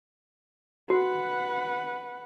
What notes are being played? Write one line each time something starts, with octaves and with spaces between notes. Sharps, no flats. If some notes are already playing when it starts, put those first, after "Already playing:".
F#4 B4 F#5